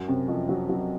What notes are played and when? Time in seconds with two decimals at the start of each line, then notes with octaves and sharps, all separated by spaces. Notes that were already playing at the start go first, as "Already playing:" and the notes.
Already playing: F#2 F#3
0.08 C3
0.28 F2
0.49 F#3
0.69 F#3